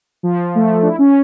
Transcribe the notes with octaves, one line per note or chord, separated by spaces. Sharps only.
F3
A3
D4
E4
C#4